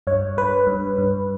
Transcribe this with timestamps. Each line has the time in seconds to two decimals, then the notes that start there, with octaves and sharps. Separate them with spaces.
0.07 G2 C#5
0.37 G2 B4
0.67 G2
0.98 G2